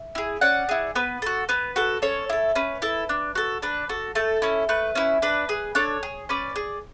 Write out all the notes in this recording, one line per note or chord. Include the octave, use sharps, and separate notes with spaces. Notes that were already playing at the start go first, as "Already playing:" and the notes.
Already playing: E5
E4 G#4
C#4 D5 F#5
E4 G#4
B3 B4
F#4 A4
B3 B4
F#4 A4
C#4 A4 C#5
E4 A4
C#4 B4
E4 A4
D4
F#4 A4
D4 B4
F#4 A4
A3 A4
C#4 E4
A3 B4
C#4 E4
D4 B4
G#4
D4 A4 C#5
G#4
C#4 B4 D5
G#4